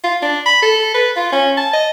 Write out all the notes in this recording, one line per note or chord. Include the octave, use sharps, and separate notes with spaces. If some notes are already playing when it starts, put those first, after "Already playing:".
F4
D4
B5
A4
B4
F4
C#4
A5
D#5